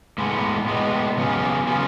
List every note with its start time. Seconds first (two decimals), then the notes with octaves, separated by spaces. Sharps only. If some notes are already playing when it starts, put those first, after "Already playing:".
0.18 A2 G#3 B3
0.68 A2 G#3 B3
1.17 C#3 F#3 B3 F4 G#4
1.67 C#3 F#3 B3 F4 G#4